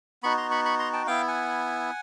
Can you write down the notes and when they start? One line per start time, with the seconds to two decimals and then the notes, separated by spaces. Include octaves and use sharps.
0.23 B3 D#4 F#4 B5 C#6
0.37 A#5 C6
0.51 B5 C#6
0.65 B5 C#6
0.79 A#5 C6
0.93 G5 A5
1.07 B3 E4 F5 G5
1.28 F#5 G#5